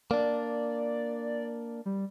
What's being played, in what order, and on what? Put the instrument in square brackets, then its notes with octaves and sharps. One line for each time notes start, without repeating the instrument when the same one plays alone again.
[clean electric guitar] A#3 D4 [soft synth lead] D5
[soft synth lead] G3